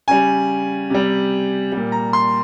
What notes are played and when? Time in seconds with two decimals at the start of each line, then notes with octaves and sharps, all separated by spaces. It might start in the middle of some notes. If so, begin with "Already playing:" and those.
0.08 C#3 G3 G#5
0.90 C3 G3
1.72 A#2 G3
1.92 A#5
2.13 C6